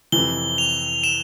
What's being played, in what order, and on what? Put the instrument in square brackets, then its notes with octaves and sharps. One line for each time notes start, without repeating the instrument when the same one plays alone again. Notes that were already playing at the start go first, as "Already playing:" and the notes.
[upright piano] F2 C3 E3 [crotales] G7
[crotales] F7
E7